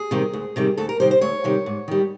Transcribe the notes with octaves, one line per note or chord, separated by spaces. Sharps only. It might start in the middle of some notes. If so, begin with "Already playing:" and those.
Already playing: G#4
C3 D#3 G3
D2
C3 D#3 G3
D2 A4
A#4
C3 D#3 G3 C5
C5
D2 C#5
C3 D#3 G3
G#2
D#3 G3